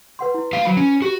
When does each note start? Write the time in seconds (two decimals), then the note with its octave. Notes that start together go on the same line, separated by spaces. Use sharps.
0.19 B4 F#5 C6
0.34 E4
0.53 G4 F5
0.65 F#3 B5
0.77 C#4
1.02 F#4 G4